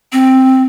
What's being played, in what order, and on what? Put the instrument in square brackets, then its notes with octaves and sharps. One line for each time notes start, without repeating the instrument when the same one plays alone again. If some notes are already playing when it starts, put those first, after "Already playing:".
[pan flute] C4